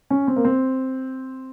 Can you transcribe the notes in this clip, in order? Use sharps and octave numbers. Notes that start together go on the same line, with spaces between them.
C#4
C4
A#3
C4